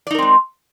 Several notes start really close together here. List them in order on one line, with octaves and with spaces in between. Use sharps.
D5 D#4 A#4 C4 G#3